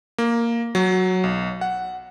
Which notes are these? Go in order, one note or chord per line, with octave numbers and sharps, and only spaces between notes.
A#3
F#3
B1
F#5